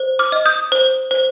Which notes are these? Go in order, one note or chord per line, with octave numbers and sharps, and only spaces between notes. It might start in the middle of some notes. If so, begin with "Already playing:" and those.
Already playing: C5
D6 F6
D#5
D#6 G6
C5
C5